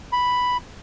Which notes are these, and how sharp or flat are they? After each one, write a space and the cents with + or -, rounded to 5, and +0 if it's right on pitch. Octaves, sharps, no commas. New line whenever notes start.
B5 +0